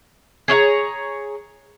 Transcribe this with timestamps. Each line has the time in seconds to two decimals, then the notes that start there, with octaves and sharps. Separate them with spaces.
0.48 G#4 C#5 F5 A#5